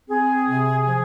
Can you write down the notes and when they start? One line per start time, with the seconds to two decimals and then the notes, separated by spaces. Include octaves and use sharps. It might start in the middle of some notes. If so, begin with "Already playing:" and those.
0.09 C4 G#4
0.48 C3
0.87 F3